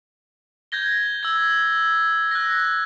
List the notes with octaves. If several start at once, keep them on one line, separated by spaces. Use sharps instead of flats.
G6 G#6 A#6 G7
E6 G#6
F#6 A#6